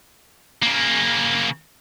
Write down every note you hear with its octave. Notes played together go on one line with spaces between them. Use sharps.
C#3 A#3